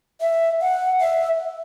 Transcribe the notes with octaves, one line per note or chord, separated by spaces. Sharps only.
E5
F#5
E5